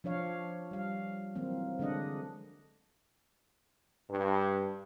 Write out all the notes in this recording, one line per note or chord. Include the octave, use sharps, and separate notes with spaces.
F3 D4 C#5 F5
G3 F5
E3 F#3 A#3 C4
D3 G#3 D4 D#5 F#5
G2